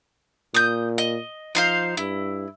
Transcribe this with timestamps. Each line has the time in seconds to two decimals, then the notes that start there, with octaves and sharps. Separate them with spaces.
0.54 A#2 D#6 G6
0.98 D#5
1.55 F3 D#4 C5 F5
1.97 G2 E4